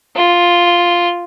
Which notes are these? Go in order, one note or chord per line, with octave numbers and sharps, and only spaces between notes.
F4